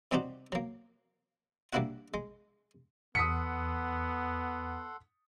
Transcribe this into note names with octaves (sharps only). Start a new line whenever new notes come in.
C3 G3 C4 D#4 F#4 G4
F#3 A#3
G3 A#3 D4 E4 F#4 F#5
G#3
E2 B3 A4 F#5 C6 D#6 B6 C#7